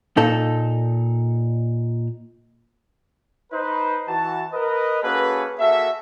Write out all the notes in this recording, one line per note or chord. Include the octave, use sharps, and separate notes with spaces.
A#2 D#4 A4
D#4 B4 C5
E3 F#4 A5
A#4 B4 D#5
A#3 C#4 F#4 G#4 A4 B4
A#3 F#4 G#4 A4 E5